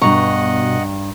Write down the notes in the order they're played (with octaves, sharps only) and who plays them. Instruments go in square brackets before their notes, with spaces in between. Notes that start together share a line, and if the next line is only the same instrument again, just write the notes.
[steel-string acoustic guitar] G2 A#5 [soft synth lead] B2 [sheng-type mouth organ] D#5 F#5 [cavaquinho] C#6